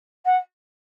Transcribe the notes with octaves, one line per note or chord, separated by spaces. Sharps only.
F#5